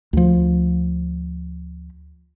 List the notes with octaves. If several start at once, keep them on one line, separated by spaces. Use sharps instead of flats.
D2 F3